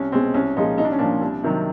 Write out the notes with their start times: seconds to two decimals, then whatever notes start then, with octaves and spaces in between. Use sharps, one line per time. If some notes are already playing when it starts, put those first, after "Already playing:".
Already playing: C2 C#4
0.12 B2 G#3 C4
0.34 C2 C#4
0.57 A#2 F3 G#3 D#4
0.78 C2 D#4
0.85 D4
0.92 C#4
0.99 A#2 F3 D4
1.21 C2
1.43 C3 D#3 F#3